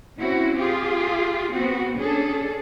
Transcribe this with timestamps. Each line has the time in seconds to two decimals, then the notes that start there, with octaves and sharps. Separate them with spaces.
0.19 C4 C#4 E4 F#4
0.59 F4 G4 G#4
1.53 B3 C4 F#4
1.98 C#4 D4 G#4 A4